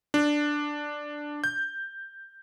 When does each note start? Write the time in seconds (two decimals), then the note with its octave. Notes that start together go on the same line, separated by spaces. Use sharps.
0.14 D4
1.44 G6